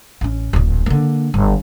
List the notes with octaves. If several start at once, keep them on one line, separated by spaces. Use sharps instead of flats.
A1 C#4
D1 A#1
D3 A#3
G1